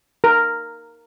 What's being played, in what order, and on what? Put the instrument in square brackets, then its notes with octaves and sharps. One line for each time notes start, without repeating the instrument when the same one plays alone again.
[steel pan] A#4